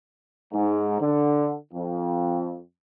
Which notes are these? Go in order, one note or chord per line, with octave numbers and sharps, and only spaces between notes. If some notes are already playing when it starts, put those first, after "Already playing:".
G#2
D3
F2